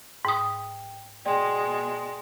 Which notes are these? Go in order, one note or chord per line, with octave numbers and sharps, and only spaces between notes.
G#2 G5 D#6
B2 G#3 D5 G5 C6